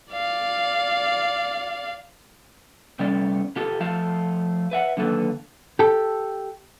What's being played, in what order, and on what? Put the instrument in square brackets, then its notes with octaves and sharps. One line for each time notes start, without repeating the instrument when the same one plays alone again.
[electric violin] D5 F5
[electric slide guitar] C3 G3 A3 B3 C#4 D5
B2 F4 G4 A4
F3 A3 F5 A5
B4 E5 F#5
D3 D#3 F#3 A#3 A4 B4
[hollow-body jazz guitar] G4 A4